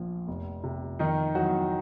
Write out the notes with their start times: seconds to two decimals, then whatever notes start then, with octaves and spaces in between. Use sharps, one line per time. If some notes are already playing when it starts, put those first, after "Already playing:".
Already playing: A#1 F3
0.27 F1
0.64 C3
0.99 F2 D#3 D#4
1.35 E3 F#3 F#4